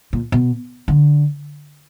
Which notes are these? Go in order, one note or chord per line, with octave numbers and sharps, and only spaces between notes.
A#2
B2
D3